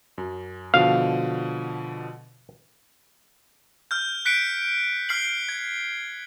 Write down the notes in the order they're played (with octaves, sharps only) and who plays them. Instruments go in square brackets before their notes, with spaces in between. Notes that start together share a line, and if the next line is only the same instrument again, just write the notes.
[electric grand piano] F#2
[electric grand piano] B2 D3 F3 [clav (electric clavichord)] F5
[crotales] F6 G6
F#6 B6 C#7 D7
F6 C7 F#7
G#6